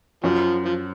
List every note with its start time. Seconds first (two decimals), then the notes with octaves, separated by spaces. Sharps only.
0.24 F#2 F3
0.65 F3